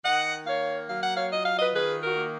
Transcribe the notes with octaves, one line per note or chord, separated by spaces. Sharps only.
D#3 D#5 F#5
A#3 C#5 F5
F#3 F5
F#5
C#5 F5
F4 D#5
F5
B4 D#5
D#3 G#4 B4
F#4 A#4
A#3